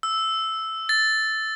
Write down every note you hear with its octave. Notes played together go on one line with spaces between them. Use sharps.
E6
A6